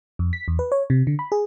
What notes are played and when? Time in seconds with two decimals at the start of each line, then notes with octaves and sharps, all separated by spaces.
0.19 F2
0.33 B6
0.48 E2
0.59 B4
0.72 C#5
0.90 C3
1.07 D3
1.19 B5
1.32 G#4